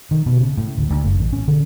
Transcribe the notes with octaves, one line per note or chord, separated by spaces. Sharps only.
D#3
B2
C#3
A2
D2
D2
F#1
A1
C#4
D3